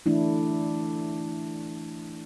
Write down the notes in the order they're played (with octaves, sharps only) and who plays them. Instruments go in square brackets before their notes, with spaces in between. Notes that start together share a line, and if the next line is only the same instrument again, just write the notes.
[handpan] E3 A3 D4 E4